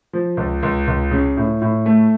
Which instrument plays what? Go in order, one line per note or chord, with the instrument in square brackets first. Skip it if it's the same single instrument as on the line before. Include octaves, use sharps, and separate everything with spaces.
[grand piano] F3
C#2
C#2
C#2
C#3
A2
A2
A3